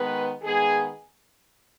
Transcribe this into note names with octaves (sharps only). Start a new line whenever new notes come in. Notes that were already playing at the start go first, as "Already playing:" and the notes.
Already playing: D#3 G#3 B3 B4
D#3 G#3 B3 G#4